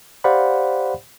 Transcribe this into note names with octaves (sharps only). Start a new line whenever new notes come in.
G4 C5 D5 F5 F#5 B5